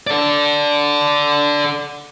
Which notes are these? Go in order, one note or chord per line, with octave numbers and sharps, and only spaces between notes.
A4 D5